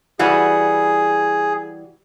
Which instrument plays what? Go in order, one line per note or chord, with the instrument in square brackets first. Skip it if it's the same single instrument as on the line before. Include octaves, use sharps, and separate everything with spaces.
[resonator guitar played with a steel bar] E3 G3 F#4 [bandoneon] G#4